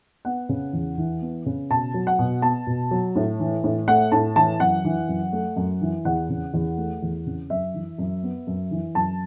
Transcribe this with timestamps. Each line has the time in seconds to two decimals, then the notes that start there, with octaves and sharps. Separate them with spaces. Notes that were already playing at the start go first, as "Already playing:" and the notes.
0.25 B3 F#5
0.49 C#3
0.73 E2
0.98 E3
1.22 B3
1.46 C#3
1.70 B2 A5
1.94 F#3
2.07 F#5
2.19 B2
2.42 B3 A5
2.67 B2
2.91 F#3
3.16 A2
3.40 E3
3.64 A2
3.88 A3 F#5
4.12 A2 A5
4.36 E3 A5
4.60 F#2 F#5
4.85 E3
5.08 F#2
5.33 A3
5.56 F#2
5.81 E3
6.05 E2 F#5
6.29 C#3
6.54 E2
6.78 A3
7.02 E2
7.26 C#3
7.50 F#2 E5
7.74 E3
7.98 F#2
8.23 B3
8.47 F#2
8.71 E3
8.95 F#2 A5